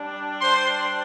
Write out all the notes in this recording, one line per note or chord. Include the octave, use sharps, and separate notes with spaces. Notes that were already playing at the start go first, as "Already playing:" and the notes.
Already playing: G3 D4
C5 C6